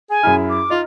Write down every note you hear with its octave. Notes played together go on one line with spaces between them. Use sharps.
G#4 G#5
F#2 E4 G#4 F6
D6
D#4 F4